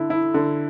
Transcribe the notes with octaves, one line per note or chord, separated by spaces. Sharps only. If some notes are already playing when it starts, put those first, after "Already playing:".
Already playing: D3 E4
E4
D3